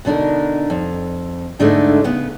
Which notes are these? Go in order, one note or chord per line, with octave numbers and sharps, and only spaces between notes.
B2 D3 D4 D#4 A#4
F2
G#2 D3 G#3 A3 D4 D#4
C#3 B3